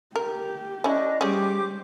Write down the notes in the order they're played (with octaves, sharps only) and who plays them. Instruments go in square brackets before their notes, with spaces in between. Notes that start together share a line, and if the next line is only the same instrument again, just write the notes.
[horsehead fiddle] G4 [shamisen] A#4
[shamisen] C#4 E4 [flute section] D4 D#5
[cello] G3 [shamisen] C#4 G#4 [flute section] G4 D6 [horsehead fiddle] C5